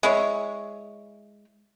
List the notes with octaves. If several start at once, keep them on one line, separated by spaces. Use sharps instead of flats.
G#3 E4 C#5